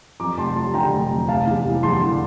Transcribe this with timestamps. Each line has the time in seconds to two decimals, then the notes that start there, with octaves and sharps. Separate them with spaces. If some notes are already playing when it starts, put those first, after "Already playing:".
0.20 F2 A#5 D6
0.37 F1 A5 C6
0.56 F3 A5 C6
0.74 D3 G5 A#5
0.93 F1
1.10 F2
1.28 F1 F5 A5
1.47 E2
1.65 F1
1.83 E2 A5 C6
2.01 D3